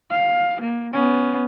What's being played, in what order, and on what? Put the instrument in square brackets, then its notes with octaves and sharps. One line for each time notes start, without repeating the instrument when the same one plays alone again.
[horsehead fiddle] F5
A#3
B3 C#4